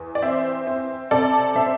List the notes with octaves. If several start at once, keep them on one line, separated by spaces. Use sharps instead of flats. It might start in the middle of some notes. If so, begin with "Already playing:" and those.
Already playing: E2
D5
C4 C5 E5
C4
C3 A4 D5
C3 C5 E5